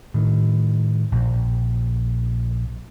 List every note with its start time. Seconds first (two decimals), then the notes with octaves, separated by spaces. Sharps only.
0.14 A2 D#3
1.12 A#1